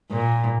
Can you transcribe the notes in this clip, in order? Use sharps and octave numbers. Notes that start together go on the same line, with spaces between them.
A#2